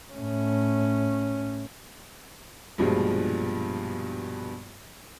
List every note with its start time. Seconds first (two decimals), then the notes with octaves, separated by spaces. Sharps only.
0.13 A2 C#4
2.78 A#1 G2 B2 F3 G3 G#3